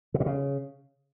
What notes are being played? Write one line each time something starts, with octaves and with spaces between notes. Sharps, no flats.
C3
A#2
C#3